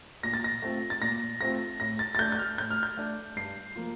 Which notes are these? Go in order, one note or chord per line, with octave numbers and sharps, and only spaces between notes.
A#2 A#6
A6
A#6
A3 C4 F4
A6
A#2 A#6
A3 C4 F4 A#6
A2 A#6
A6
A6
A3 D4 G6
G6
F6
A2 G6
F6
G6
A3 D4
G2 C7
F3 A#3 F4